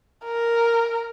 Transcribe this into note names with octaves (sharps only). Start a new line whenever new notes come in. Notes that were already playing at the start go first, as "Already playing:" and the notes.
A#4